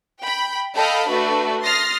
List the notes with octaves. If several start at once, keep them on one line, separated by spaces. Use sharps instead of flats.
G5 B5
A4 D#5 F5 G5 A5 B5
A3 D4 F#4 B4
C6 D#6 F6 A6 A#6 C7